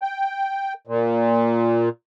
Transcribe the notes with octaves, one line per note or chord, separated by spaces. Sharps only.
G5
A#2